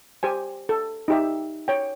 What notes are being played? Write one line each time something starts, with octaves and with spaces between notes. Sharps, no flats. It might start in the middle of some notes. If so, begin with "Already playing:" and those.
G4 C5 G#5
A4
D#4 G4 E5
C#5 G5